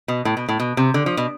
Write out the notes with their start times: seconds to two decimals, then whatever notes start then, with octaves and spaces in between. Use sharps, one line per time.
0.08 B2
0.25 A2
0.37 B2
0.49 A2
0.60 B2
0.77 C3
0.94 D3
1.06 F3
1.17 B2